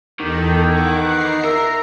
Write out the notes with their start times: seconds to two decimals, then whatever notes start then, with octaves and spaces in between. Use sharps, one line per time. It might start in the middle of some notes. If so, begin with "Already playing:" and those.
0.20 E2 D#3 G4 A4
0.65 E4 F#5 C#6 D6
1.04 B4 A#5 C7
1.44 A#4 E5